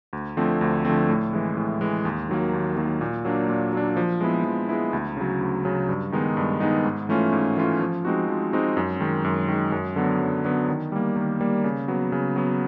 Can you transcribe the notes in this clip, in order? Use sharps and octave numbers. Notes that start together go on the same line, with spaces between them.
D2
D3 F3 A3 C4
D2
D3 F3 A3 C4
A2
E3 G#3
A2
E3 G#3
D#2
D#3 F#3 A#3
D#2
D#3 F#3 A#3
A#2
F#3 A#3 D4
A#2
F#3 A#3 D4
F3
G#3 B3 E4
F3
G#3 B3 E4
D2
C#3 F#3
D2
C#3 F#3
G2
D#3 G#3 B3 D#4
G2
D#3 G#3 B3 D#4
G#2
E3 A3 C#4 F4
G#2
E3 A3 C#4 F4
F3
G#3 C4 D#4 F#4
F3
G#3 C4 D#4 F#4
F#2
D#3 G#3
F#2
D#3 G#3
F#2
D3 F#3 B3
F#2
D3 F#3 B3
D#3
G3 A#3
D#3
G3 A#3
C#3
F#3 B3
C#3
F#3 B3